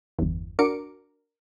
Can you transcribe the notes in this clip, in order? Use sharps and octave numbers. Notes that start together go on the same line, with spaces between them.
G1 E2
D4 F#4 A#4 D6 C#7 D7